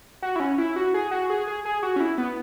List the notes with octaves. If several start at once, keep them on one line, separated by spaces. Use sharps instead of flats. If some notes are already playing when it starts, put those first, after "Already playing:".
F#4
E4
C#4
E4
F#4
G#4
F#4
G#4
G#4
G#4
F#4
C#4
E4
B3